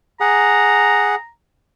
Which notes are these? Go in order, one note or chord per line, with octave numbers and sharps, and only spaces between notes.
G#4 F#5 A#5